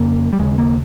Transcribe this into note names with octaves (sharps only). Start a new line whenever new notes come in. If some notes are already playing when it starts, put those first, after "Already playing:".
Already playing: F2 C#3 A#3
G3
D#2 C#3 G#3
A#3